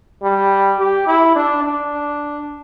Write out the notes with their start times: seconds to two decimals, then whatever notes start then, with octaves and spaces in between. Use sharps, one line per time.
0.22 G3
0.79 G4
1.07 E4
1.36 D4
1.63 D4